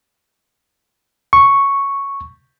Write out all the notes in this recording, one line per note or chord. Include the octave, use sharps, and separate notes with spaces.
C#6